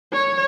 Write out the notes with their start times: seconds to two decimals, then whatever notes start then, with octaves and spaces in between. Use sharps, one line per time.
0.13 C#5